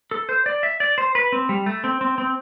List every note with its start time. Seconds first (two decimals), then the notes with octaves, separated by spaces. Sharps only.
0.11 A4
0.29 C5
0.46 D5
0.63 E5
0.80 D5
0.98 C5
1.15 B4
1.32 C4
1.49 G3
1.66 A3
1.84 C4
2.01 C4
2.18 C4